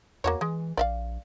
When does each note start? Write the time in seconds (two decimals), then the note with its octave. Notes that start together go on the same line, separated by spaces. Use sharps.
0.24 E2 A#3 F#4 C#5
0.41 E3 G#3
0.77 A#1 D5 E5 F5